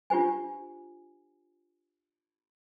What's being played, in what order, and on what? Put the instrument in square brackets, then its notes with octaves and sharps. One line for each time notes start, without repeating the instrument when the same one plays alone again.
[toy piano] D4 F4 G4 C5 G#5